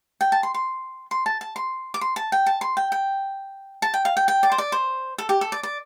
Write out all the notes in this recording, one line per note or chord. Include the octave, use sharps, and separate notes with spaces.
G5
A5
C6
C6
C6
A5
A5
C6
D6
C6
A5
G5
A5
C6
G5
G5
A5
G5
F5
G5
G5
D5
C5
D5
C5
A4
G4
A4
D5
D5